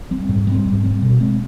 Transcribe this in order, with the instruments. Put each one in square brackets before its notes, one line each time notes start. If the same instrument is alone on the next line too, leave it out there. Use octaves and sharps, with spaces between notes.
[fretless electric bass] G3 C4
G#2
G3 C4
G#2
G3 C4
B2
G#3 C4